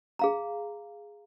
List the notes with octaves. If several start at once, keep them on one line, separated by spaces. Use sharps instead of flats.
G#4 F5 A#5